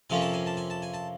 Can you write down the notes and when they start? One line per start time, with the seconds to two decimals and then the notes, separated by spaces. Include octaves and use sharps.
0.10 F2 C3 F3 A#3 C#4 G#5
0.22 A5
0.34 G#5
0.46 A5
0.57 G#5
0.70 A5
0.82 G#5
0.94 A5